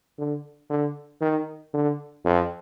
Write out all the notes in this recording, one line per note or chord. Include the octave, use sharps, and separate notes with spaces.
D3
D3
D#3
D3
F2